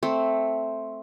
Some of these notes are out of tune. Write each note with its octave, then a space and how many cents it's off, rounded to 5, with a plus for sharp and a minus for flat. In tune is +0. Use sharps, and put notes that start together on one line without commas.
A3 +0 C4 +0